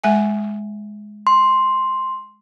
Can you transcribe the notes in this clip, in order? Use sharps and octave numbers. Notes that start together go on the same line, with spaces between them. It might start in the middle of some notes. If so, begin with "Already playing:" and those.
G#3 E5 G#5
C6